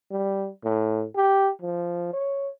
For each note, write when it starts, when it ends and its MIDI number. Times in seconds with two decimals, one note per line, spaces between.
0.11 0.49 55
0.64 1.04 45
1.16 1.50 67
1.62 2.12 53
2.13 2.49 73